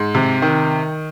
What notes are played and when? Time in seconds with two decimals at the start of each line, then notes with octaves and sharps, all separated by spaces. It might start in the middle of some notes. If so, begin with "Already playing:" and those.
Already playing: G#2
0.15 C3
0.42 D#3